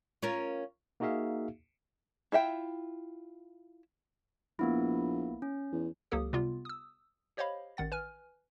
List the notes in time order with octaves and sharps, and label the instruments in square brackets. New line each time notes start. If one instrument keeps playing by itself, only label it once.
[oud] C#4 F4 A#4
[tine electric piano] A#3 D#4 F#4 G#4 E5 F5
[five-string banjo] E4 F4 E5 G5
[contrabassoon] A#1 [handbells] A#3 B3 E4
[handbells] C#4
[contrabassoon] E2
[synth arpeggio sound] C#2 F#3 A#3 G4 A4 D#6
C3 G3 B3 F4
D#6 E6
G4 C5 C#5 D#5 F5 B5
A1 D#3 F#5 A6
B4 G#5 F6